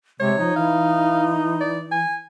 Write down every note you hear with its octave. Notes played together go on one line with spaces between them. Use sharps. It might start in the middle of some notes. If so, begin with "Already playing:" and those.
C3 G#3 C#5
F3 D#4
E3 F5
D5
G#5